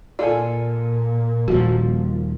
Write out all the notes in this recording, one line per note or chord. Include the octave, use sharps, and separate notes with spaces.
A#2 A#3 F4 A4 D5 G#5
D#1 F3 F#4